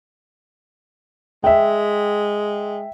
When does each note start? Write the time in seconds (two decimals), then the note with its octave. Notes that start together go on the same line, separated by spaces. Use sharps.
1.44 G#3 E5 G5